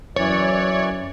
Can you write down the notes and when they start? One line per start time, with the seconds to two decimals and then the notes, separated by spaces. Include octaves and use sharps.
0.16 F#2 E3 C#5 D5